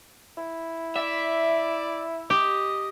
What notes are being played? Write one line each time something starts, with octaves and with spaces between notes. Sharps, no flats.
E4
D5 E5
G4 D#5